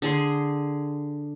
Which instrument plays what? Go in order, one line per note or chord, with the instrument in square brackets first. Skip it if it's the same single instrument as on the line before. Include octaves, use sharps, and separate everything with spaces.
[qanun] D3 G#4 C6